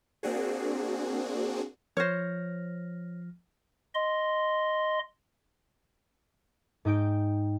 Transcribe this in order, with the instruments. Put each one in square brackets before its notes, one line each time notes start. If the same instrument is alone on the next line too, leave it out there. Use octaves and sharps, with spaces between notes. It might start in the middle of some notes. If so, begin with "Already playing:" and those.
[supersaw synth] A#3 C4 D4 F#4 G#4
[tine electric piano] F3 F6 A#6 [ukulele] C5 C#5
[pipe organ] D#5 C6
[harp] G#2 D#4 G5 D7